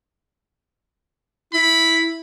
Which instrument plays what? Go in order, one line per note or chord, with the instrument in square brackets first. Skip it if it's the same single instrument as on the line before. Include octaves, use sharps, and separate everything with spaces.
[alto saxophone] E4 [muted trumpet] B5